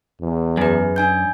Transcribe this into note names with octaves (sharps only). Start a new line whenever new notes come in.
E2
F#2 G#4 B4
D4 G#5 G6